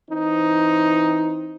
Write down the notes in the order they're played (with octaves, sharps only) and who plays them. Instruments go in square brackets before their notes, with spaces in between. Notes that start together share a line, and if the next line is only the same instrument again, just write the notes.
[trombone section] E3 C4 D#4